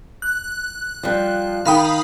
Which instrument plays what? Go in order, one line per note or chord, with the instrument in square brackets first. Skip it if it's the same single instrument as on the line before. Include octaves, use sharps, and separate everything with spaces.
[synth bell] F#6
[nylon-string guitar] F3 G3
[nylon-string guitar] D#3 G5 [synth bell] F5 B5 D#6